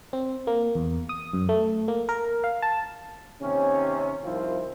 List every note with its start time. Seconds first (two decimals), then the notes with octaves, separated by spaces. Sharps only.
0.13 C4
0.47 A#3
0.75 E2
1.09 D#6
1.33 F#2
1.49 A3
1.88 A#3
2.09 A#4
2.44 F5
2.62 A5
3.41 D#2 C3 C4 C#4
4.24 C2 D#3 F3 C4 E4 F4